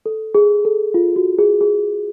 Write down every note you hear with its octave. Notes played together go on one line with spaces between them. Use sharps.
A4
G#4
A4
F4
F#4
G#4
G#4